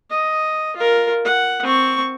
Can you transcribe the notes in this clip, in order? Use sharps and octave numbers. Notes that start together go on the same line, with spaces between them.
D#5
F4 A#4
F#5
C4 C#6